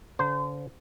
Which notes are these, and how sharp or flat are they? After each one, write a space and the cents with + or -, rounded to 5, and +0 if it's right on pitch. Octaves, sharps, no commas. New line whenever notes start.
D3 -45 C5 -30 A#5 +0